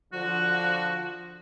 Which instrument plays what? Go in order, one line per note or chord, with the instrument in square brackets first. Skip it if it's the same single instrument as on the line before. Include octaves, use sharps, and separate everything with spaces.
[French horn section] D3 F3 [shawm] F#4